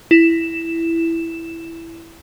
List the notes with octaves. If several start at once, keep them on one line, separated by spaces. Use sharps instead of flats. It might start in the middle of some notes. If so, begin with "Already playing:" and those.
E4 E7